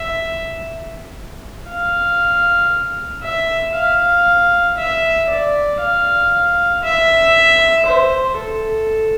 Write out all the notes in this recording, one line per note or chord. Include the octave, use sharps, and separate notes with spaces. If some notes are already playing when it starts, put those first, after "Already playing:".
Already playing: E5
F5
E5
F5
E5
D5
F5
E5
C5
A4